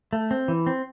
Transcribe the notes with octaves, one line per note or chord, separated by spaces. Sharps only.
A3
C4
E3
C4